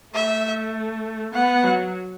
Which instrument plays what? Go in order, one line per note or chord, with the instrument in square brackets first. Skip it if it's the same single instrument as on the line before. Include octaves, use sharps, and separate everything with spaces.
[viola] A3 [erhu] E5
[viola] B3 [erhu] F#5
[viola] F#3